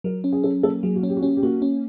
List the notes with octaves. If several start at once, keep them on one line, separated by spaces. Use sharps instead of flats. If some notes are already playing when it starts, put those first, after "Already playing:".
F#3 A#4
C#4
G#4
C#4 A4
A#3 A4
F#3 G#4
F#4
C#4
G4
F#4
C#4 G4
G4
A#3 F#4
C#4